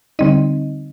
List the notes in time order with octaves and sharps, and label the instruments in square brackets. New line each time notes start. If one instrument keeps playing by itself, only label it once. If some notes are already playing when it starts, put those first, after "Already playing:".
[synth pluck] D3 G3 C4 D#4 D#5